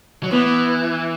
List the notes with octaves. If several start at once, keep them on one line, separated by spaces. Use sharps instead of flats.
F#3
E3 B3